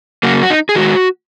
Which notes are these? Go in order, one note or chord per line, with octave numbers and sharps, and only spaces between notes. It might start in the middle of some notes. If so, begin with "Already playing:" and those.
C#3 F#3 A#3 F#4
F#4
D#4
G#4
D#3 G#3 F#4